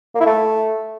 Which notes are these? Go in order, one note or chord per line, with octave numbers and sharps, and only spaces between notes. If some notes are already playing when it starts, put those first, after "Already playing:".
A#3
E4
A3